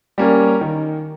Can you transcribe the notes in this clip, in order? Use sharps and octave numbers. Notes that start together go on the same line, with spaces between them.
G3 A#3 C#4
D#3